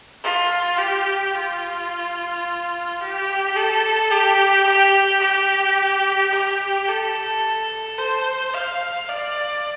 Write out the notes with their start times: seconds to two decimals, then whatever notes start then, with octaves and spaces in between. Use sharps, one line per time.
0.23 F4
0.78 G4
1.34 F4
3.00 G4
3.56 A4
4.11 G4
4.67 G4
5.21 G4
6.32 G4
6.88 A4
7.98 C5
8.54 F5
9.09 D5